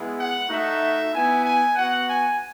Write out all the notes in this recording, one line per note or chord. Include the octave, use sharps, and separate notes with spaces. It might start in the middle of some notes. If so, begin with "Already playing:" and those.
Already playing: G#3 B3 E4
F#5
A3 D#4 F#4 E5
B3 E4 G#5
G#5
B3 F#4 F#5
G#5